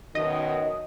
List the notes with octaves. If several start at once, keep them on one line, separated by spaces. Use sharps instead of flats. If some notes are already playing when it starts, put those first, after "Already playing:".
F#2 B2 D#3 D#5